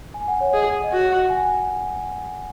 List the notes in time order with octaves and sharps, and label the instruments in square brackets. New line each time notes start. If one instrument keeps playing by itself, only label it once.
[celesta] G#5
F#5
C#5
[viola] G#4 [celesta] D#5
[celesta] D#5
[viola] F#4 [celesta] F#5
[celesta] F#5
G#5